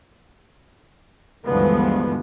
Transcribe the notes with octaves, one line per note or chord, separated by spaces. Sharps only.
D2 G2 E3 F3 G#3 B3